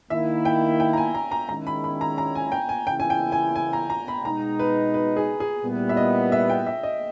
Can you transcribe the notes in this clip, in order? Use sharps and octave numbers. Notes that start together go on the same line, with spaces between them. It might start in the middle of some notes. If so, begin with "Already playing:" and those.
D#3 A#3 E4 E5
G5
G5
A#5
G#5
A#5
A#5
D#3 G#3 C#4 E4 A#5
B5
B5
A#5
A#5
G#5
G5
G#5
C#3 E3 A#3 C#4 E4 G5
G#5
G5
G#5
G#5
A#5
A#5
B5
B2 G#3 D#4 A#5
B4
B4
G#4
G#4
A#2 G3 B3 E4
E5
D#5
E5
G5
E5
D#5